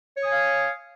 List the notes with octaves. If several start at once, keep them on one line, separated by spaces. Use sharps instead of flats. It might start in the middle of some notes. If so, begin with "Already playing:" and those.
C#5 F5 G#5 D#6